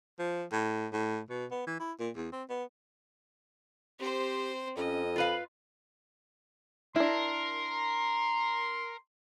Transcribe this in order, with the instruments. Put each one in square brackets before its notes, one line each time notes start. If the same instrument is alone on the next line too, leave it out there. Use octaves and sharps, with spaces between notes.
[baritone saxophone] F3
A2
A2
B2
B3
E3
E4
A#2
E2
C4
B3
[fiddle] C4 C5 [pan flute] G4
[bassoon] F2 [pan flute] C#4 [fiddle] D#5
[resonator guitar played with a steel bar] F4 B4 F5 [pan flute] B5
[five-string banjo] D4 E4 [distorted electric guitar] A#4 [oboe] C6